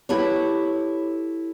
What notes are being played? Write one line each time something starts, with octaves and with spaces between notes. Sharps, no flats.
E4 G4 A4 B4 C#5